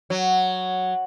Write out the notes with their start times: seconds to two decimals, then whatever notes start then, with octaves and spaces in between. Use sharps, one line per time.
0.10 F#3